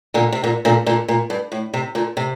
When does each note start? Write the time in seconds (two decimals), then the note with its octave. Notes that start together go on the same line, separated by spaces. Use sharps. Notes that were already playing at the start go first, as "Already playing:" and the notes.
0.14 A#2 D3
0.32 C3
0.44 A#2 D3
0.65 A#2 D3
0.86 A#2 D3
1.08 A#2
1.30 G2
1.52 A2
1.74 C3
1.95 A#2 D3
2.17 C3